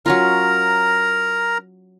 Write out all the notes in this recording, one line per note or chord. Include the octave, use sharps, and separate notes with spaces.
F#3 C#4 F4 A#4 A#5